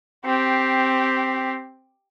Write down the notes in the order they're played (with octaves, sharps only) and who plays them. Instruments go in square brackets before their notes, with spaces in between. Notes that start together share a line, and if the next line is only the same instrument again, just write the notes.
[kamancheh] C4 G4